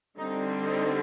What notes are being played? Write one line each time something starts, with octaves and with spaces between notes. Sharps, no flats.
D3 G3 C4 D#4
D#4